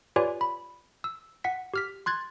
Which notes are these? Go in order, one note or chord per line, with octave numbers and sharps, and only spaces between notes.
F4 G4 B4 C#5 D5 G#5
B5
E6
F#5 B6
G4 F6 B6
C6 F#6 G#6 A6